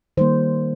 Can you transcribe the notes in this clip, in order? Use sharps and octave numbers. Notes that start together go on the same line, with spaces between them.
D#3 G3 A#3 C5